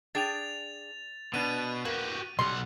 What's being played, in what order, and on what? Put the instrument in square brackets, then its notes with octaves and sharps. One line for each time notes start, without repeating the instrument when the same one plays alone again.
[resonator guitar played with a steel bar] D4 G#4 G5 [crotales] A6 F7
[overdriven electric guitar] B2 [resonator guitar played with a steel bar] B3 D4 [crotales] D#7
[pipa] A#3 [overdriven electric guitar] F#4 G4
[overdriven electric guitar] B1 F#5 [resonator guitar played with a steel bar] C#3 G3 [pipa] C6